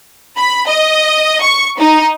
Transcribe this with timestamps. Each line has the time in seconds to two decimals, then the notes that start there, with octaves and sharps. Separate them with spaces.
0.37 B5
0.68 D#5
1.42 C#6
1.78 D#4